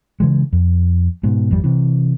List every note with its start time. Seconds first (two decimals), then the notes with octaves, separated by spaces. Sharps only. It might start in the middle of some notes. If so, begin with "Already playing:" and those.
0.20 C#3 E3 G#3
0.53 F2
1.23 G#2 B2
1.51 G#1 F2 G3
1.64 C3 E3